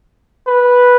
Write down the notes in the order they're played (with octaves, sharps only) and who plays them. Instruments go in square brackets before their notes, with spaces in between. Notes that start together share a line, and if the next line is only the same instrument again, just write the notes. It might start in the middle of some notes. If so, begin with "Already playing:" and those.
[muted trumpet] B4